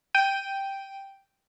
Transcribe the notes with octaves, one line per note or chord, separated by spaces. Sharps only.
G5 D#7